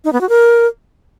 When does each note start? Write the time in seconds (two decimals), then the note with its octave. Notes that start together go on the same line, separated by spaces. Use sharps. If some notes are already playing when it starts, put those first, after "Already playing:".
0.04 D#4
0.13 B3
0.21 F#4
0.29 A#4